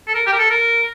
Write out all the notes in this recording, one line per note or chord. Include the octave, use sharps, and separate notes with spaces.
A4
A#4
G4
A#4
A4
A#4